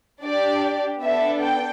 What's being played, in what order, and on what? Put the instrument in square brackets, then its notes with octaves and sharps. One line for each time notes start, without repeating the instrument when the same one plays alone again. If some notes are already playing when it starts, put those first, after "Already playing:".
[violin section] D4 G4 D5
B3 D4 A4 E5
G5